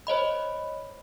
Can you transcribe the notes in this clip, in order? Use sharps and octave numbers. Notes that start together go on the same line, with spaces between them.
C5 C#5 D#5 B5